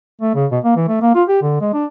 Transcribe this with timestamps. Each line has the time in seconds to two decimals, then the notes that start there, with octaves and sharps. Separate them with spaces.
0.22 A3
0.35 C#3
0.52 B2
0.64 A#3
0.76 E3
0.88 A3
1.01 A#3
1.15 F4
1.28 G4
1.42 D3
1.61 G#3
1.73 D4